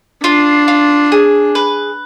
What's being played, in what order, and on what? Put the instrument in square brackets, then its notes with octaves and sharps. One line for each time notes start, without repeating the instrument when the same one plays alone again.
[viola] D4 [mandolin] F4
[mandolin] F4
G#4
B4